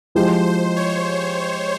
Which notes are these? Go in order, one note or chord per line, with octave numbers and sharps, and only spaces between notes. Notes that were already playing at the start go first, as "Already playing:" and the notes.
F3 G#3 E4 G4 C5
C5
C#5